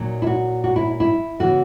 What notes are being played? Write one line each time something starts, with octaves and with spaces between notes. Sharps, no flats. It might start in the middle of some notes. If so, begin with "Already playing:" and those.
Already playing: A#2 F#3 A#3 D#4
E4
F#4
F#4
E4
E4
C#3 E3 B3 F#4